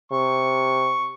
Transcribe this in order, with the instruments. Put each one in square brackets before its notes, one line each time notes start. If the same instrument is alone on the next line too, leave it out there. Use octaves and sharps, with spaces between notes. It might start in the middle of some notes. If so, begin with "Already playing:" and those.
[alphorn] C3 [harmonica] C#6